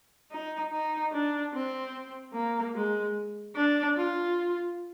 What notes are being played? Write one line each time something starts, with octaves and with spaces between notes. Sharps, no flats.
D#4
D#4
D4
C4
A#3
G#3
D4
F4